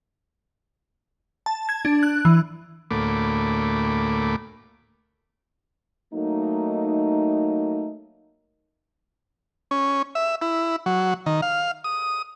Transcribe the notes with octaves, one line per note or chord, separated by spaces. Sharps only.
A5
G#6
D4
F#6
E3
D2 A2 A3 A#3 B5 D6
F#3 A3 A#3 D#4
C#4
E5
E4
F#3
D#3
F5
D#6